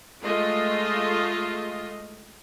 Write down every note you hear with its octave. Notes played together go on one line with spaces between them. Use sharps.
G#3 A3 F4 D#5